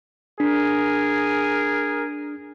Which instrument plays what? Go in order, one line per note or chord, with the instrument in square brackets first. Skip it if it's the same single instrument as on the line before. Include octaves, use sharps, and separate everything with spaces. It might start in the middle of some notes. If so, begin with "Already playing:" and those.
[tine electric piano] D4 [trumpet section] G#4 A#4